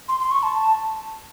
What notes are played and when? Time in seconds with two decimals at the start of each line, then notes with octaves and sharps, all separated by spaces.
0.09 C6
0.20 C6
0.31 C#6
0.43 A5